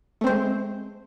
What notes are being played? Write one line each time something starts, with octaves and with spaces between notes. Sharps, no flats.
G#3 A3 C4 C5